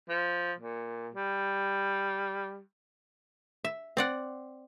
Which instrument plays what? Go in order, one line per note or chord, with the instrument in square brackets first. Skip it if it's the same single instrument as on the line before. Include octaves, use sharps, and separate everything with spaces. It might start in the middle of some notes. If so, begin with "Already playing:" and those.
[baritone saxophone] F3
A#2
G3
[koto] E5
C4 D5 F#5